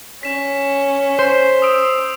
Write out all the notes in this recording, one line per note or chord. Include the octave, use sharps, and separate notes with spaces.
C#4 B6 E7
C5
D#6 E6 D7